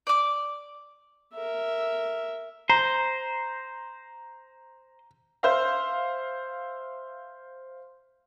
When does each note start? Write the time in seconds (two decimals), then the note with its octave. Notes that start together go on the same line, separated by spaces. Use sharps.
0.07 D5 D6
1.33 A#4 E5
2.70 C5 A#5
5.43 C5 E5 F5